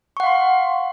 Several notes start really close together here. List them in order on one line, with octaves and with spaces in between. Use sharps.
C#6 F#5 F5 C6